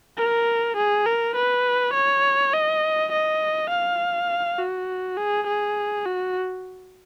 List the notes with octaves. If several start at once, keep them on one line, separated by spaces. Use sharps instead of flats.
A#4
G#4
A#4
B4
C#5
D#5
D#5
F5
F#4
G#4
G#4
F#4